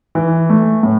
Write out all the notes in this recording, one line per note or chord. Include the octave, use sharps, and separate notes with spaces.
E3
A3
A2